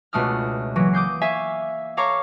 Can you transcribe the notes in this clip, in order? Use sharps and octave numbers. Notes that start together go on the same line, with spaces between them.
C#2 B2 A3 D4 D#6 F6
C#3 E3 F#3 A#3
D6 D#6 G6 C7
E5 F5 G#5 C#6
A4 C#5 F5 A#5 C#6 D6